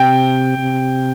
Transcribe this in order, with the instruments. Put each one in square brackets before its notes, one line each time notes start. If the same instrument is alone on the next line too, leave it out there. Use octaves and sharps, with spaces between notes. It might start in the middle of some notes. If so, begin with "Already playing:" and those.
Already playing: [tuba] C3 [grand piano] G5
[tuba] C3